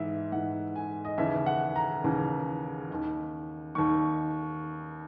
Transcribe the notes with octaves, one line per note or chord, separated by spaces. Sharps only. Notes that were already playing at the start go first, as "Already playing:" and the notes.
Already playing: G#2 E3 E5
G#2 E3 F#5
G#5
D#5
D#2 C#3 E3 E5
F#5
A#5
D#2 C#3 E3
D#2 D#3
D#2 D#3 C#6